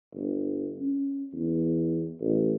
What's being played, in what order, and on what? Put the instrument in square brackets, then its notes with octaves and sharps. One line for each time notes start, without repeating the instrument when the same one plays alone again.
[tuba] G1
C#4
E2
A1